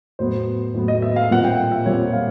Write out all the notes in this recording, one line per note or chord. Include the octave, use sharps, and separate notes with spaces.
A2 F#3 B3 C5
A2 F#3 B3
D#5
E5
F5
A#2 G3 C4 F#5
G5
E5
A#2 G3 C4 C#5
F5